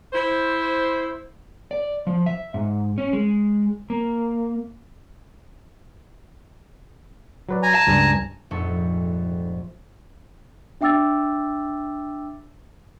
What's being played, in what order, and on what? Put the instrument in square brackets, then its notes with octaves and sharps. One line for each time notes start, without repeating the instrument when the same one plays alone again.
[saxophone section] E4 C5
[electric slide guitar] D5
F3
E5
G#2
C#4
G#3
A#3
[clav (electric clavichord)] F#3 B4 D5
[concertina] G#5 A#5
[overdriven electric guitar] A5
[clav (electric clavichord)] C#2 G2 G3
[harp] F1 A#1 F2 G#2 A4 C#6
[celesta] D4 E5 G5 D6 E6 A6